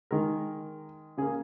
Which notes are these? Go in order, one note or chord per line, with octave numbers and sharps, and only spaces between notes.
D#3 G#3 A#4
C#3 A#3 G#4